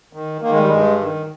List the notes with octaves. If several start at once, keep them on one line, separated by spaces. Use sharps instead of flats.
D#3
D#3 A#3
G#3
G3
G2 G#3
D#3